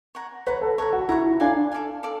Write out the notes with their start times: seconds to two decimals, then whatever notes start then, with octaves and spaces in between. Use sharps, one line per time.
0.15 C#5 F#5 A#5
0.46 B4 C#5 F#5 A#5
0.61 A4
0.78 A4 C#5 F#5 A#5
0.93 F#4
1.09 E4 C#5 F#5 A#5
1.25 E4
1.40 D4 A4 D5 F5 G#5
1.71 A4 D5 F5 G#5
2.03 A4 D5 F5